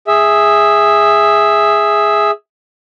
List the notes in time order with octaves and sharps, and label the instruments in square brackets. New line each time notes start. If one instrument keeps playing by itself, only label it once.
[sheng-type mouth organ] G#4 E5